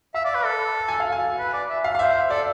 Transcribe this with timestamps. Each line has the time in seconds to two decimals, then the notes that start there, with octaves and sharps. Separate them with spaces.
0.14 E5 F5
0.25 D5
0.35 B4
0.45 A4
0.88 G#5
1.00 F5
1.12 G#5
1.38 B4
1.53 D5
1.69 E5
1.84 F5
1.95 F5
1.99 C5 E5
2.30 A4 D5